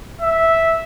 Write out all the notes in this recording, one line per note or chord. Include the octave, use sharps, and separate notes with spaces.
E5